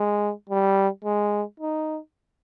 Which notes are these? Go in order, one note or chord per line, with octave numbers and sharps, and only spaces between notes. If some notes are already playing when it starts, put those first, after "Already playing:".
Already playing: G#3
G3
G#3
D#4